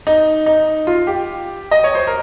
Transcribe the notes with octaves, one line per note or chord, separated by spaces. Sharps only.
D#4
D#4
F4
G4
D#5
C#5
C5
A#4